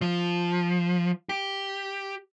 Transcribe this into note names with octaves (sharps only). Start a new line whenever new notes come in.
F3
G4